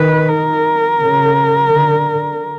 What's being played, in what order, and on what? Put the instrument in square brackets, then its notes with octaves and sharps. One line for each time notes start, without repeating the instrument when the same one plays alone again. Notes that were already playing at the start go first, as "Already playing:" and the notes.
Already playing: [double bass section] D#3 [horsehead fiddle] B4
[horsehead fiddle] A#4
[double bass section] C#3
D3